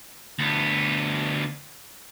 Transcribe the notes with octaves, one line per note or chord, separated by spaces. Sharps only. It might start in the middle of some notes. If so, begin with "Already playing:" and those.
D2 B3